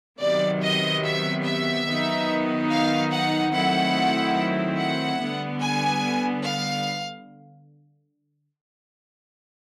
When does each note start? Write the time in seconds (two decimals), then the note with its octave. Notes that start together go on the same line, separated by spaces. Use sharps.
0.20 C3 D#3 F#3 B3 D5
0.62 D#5
1.03 E5
1.45 E5
1.87 D#3 F#3 B3 D#4
2.70 F5
3.11 F#5
3.53 D#3 F#3 A3 C4 E4 F#5
4.78 F#5
5.19 D3 G3 B3
5.61 G#5
6.44 F5